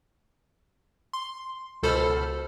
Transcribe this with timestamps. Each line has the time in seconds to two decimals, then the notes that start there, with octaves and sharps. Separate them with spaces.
1.13 C6
1.83 C#2 B2 A4 C5 B5 F6